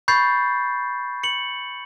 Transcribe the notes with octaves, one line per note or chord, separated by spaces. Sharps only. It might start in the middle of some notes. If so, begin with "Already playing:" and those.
B5 C#6 G6 A6 C7
C#7 F#7